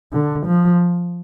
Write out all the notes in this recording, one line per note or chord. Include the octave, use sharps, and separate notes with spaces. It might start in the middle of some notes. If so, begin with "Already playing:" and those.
D3
F3